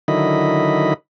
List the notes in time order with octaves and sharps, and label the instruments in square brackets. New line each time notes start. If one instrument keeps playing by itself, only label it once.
[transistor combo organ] D3 D#3 F#3 E4 D#5 B5